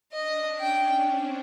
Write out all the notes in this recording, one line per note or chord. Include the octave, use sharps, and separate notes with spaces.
D4 D#5
C#4
G5
C#4
C4